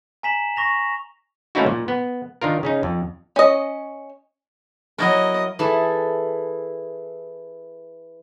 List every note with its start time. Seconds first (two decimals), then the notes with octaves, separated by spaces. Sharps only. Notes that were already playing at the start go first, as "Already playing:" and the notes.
0.23 G#5 A#5 B6 E7 F#7
0.56 C#6 A#6 F7
1.55 A3 A#3 C#4 D#4 E4 F#4
1.66 A#2
1.88 B3
2.42 D#3 D4 F4 A#4
2.63 C#3 C#4 D#4
2.83 F2
3.36 C#4 D#5
4.98 F#3 E4 A#4 D#5
5.59 E3 E4 G#4 A4